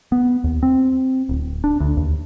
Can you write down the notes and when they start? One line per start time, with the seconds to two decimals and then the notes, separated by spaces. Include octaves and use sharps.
0.12 B3
0.44 D#2
0.63 C4
1.29 D1
1.64 D4
1.80 D2
1.97 D#2